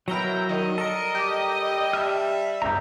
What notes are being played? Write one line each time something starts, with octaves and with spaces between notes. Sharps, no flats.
B2 F#3 E4 A#4 G5 A#5
D#3 G3 D#5
A4 A#4 C#7
G4
G3 E5 A5 F6
G#1 C#2 G2 A#5 G6